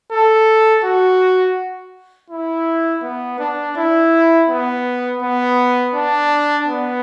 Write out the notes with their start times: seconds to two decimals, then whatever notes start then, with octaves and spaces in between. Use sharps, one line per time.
0.12 A4
0.85 F#4
2.30 E4
3.03 B3
3.39 D4
3.77 E4
4.50 B3
5.23 B3
5.95 D4
6.67 B3